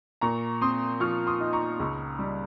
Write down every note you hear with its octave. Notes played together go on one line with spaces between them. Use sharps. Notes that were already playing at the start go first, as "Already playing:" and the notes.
A#2 A#5 C#6
C4 C6 D#6
F3 C#6 F6
C6 D#6
D#4
A#5 C#6
C#2
G3